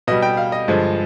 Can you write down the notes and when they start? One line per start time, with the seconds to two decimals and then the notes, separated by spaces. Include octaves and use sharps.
0.07 B2 G3 D#5
0.22 G5
0.37 F5
0.52 D#5
0.68 G2 D3 F3 G#3